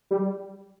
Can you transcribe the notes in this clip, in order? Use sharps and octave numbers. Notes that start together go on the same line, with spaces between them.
G3